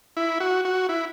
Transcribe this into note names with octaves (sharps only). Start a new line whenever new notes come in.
E4
F#4
F#4
E4